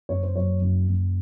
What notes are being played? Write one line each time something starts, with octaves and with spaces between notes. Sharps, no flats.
F#1 C#5
C5
F#2 C#5
F#1
F#1